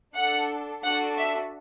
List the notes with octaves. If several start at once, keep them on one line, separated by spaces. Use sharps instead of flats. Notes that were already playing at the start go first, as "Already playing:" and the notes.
D4 A4 F#5
D4 F#4 A4 F#5
E5